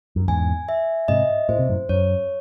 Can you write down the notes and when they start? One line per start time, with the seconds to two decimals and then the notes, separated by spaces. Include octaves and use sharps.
0.16 F#2
0.28 E2 G#2 G#5
0.69 E5
1.08 G#2 C3 D#5
1.49 A2 C5
1.59 C3
1.69 F#2 A2
1.89 F#2 C#5